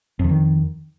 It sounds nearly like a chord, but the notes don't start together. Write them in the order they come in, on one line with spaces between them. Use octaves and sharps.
F2 D3 D#3